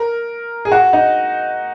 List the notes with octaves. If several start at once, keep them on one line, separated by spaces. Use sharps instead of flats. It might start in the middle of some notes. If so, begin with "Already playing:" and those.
Already playing: A#4
G#4
F#4
D#4